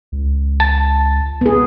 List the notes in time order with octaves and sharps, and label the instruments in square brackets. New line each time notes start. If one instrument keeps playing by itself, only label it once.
[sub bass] C#2
[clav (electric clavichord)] A5
[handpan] B3 G#4